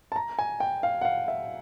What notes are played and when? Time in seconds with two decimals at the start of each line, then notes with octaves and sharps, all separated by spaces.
0.12 A5
0.16 A#5
0.39 G#5
0.60 G5
0.83 F5
1.01 F#5
1.05 F5
1.28 E5